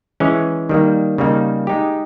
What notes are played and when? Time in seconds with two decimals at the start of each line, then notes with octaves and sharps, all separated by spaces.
0.20 E3 G#3 C#4
0.69 D#3 G3 A#3
1.18 C#3 G3 A#3 D#4
1.67 G#3 D#4 G4